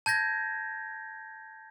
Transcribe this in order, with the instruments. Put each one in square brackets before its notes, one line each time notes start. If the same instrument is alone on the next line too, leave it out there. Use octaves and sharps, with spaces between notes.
[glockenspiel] A5 G6 G#6 A#6